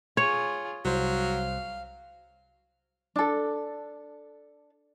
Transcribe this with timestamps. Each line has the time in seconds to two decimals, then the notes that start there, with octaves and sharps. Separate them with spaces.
0.17 F4 G#4 C#5
0.85 C2 F#3 C5 F5
3.16 D4 A4